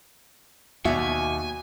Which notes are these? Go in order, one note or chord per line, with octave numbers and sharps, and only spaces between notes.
D#2 B2 F#4 E5 G#5